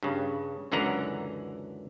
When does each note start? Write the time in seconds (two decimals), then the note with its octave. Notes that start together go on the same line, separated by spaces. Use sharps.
0.03 G2 C#3
0.72 C#2 F#2 D3 E3 F#5 A#5